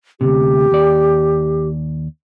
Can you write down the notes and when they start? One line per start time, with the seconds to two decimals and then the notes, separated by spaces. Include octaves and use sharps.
0.21 D2 G#2 C3 G4
0.72 D#2 D5